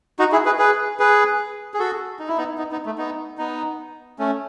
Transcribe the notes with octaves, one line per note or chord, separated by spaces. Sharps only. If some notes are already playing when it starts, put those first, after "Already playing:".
D#4 F#4
E4 G#4
G#4 B4
G#4 B4
G#4 B4
G#4
F#4 A4
D#4
E4
B3 D#4
B3 D#4
B3 D#4
A3
B3 D#4
B3 D#4
A3 C#4